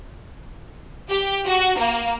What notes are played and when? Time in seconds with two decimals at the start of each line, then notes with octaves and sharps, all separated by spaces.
1.11 G4
1.47 F#4
1.79 A#3